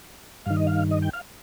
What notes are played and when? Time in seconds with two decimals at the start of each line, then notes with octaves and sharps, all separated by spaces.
0.46 G2 D#3 F5
0.56 D#5
0.67 F5
0.91 D#5
1.02 G5
1.13 F5